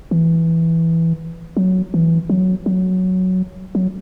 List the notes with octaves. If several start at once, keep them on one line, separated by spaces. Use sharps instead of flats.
E3
F#3
E3
F#3
F#3
F#3